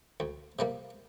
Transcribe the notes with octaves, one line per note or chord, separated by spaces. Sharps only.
D2
C3 G3 A#3